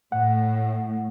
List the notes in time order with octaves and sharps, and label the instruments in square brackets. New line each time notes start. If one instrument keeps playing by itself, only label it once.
[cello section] A2 [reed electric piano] F#5